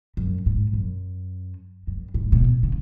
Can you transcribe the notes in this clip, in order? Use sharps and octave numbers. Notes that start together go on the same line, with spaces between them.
F#2
G#2
F#2
F#2
G#2
B2
A2
C#3